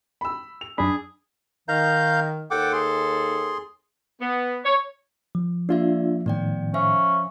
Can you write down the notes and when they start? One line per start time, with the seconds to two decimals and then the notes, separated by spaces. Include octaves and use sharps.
0.21 B5 E6
0.61 F7
0.78 F#2 D4 G#4 B5
1.69 D#3 F5 A#5 G6
2.51 D#2 A4 F#5 G5 D6
2.73 G#4 C6
4.20 B3
4.65 C#5
5.35 F3
5.69 A#3 D4 F4 D5 E5
6.26 A2 D#3 B3 D5 G5
6.74 C#4 C5 E5 F5